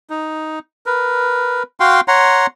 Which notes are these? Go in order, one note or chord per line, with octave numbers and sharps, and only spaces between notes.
D#4
A#4 B4
F#4 F5 G5 C6
C#5 F#5 A#5 C6